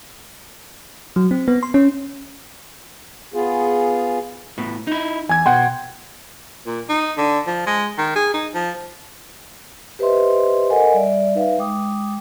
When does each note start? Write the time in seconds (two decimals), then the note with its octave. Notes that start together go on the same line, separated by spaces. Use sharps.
1.16 F#3
1.31 C4
1.48 B3
1.63 C6
1.74 C#4
3.34 B3 F4 G#4
4.58 A2 B3
4.87 D#4 E4
5.29 E2 G#5 G#6
5.46 B2 F#5 G5 C6
6.67 A#2
6.89 D#4
7.18 D3
7.47 F3
7.67 G#3
7.98 D#3
8.16 G#4
8.34 D#4
8.54 F3
9.99 G4 B4 C5 D#5 E5 C6
10.70 A4 A#4 D#5 F#5 G#5
10.94 G3 D5 E5
11.35 D#4 B4 E5 F5
11.58 G#3 G5 D6 D#6